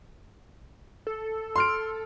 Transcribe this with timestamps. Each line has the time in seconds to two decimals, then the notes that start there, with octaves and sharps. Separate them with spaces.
1.07 A4
1.56 C6 F6 D7